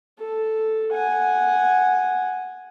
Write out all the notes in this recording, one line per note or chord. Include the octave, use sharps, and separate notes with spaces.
A4
F#5 G#5